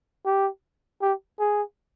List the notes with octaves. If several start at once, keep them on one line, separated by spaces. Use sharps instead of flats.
G4
G4
G#4